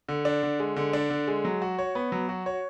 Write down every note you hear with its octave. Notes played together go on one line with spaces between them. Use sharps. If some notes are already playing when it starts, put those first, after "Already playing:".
D3
D4
D3
G#3
D3
D4
D3
G#3
F#3
F#4
C#5
B3
F#3
F#4
C#5